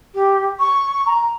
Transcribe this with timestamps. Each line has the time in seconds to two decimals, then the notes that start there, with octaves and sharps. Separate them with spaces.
0.14 G4
0.59 C#6
1.06 A#5